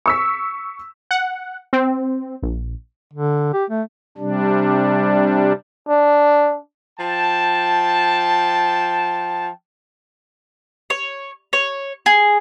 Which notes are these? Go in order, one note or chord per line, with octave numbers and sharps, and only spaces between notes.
C#6 E6 B6
F#5
C4
A#1
D3
G4
A3
C3 G3 D4
D4
F3 G5 A5
C#5
C#5
G#4